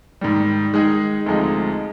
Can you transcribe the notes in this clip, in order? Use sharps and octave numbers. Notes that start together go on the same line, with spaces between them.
G#2 D#3 G3
D#3 G#3 D#4 G#4
D2 C3 F3 G#3 D#4